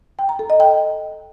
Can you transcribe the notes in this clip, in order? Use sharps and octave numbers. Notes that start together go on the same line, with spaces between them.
G5
A#5
A4
D#5
G5